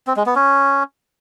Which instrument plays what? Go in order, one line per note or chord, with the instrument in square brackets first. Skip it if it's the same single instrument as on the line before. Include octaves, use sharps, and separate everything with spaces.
[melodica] C4
G#3
B3
C#4